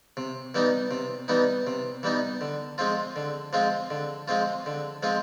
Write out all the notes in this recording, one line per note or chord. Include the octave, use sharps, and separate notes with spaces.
C3
E3 G3 B3 D#4
C3
E3 G3 B3 D#4
C3
E3 G3 B3 D#4
D3
F3 G#3 C4 F4
D3
F3 G#3 C4 F4
D3
F3 G#3 C4 F4
D3
F3 G#3 C4 F4